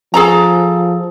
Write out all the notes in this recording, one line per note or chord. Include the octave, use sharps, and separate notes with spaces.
F3 G#4 A4 A#5